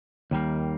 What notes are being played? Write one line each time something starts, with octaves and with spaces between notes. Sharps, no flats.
D#2 D#3 G3 A#3